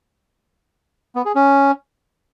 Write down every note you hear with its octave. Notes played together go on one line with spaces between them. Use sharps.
B3
G#4
C#4